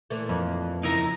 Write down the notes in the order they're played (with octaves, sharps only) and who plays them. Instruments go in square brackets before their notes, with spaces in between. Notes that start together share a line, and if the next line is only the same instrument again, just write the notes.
[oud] A#2 E3 A3
[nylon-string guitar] F2
[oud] C#3 [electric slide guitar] D#4 E4 A#4